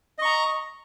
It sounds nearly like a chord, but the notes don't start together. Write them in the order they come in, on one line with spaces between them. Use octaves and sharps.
D#5 C#6 A#5